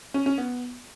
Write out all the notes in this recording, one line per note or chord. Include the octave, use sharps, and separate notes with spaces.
C#4
C#4
B3